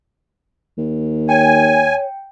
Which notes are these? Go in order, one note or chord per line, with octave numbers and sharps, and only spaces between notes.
D#2
C#5 G5 G#5